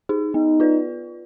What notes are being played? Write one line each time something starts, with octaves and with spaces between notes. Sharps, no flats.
D#4 G#4
B3 D#4
F4 B4 D5